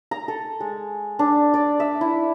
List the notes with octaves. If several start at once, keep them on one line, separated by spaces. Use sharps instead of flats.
A#5
A4
G#3
D4
D5
E5
E4